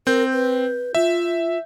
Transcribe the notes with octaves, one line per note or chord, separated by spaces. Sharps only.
C4 A#4 G6
B4
F4 E5